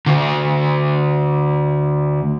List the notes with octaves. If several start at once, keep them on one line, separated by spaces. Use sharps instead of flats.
D2 D3